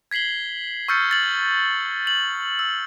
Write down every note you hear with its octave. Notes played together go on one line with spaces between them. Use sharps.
G#6 B6 C7 F#7 G7
C#6 E6 F6 G6 A6 C#7
A6 F#7
F#7
E6